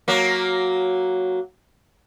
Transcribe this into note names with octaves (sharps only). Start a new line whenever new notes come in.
F#3 A#3